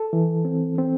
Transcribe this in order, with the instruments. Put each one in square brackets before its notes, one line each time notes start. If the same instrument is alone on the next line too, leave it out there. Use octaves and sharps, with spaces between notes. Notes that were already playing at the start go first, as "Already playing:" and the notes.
Already playing: [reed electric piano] A4
E3
C4
C4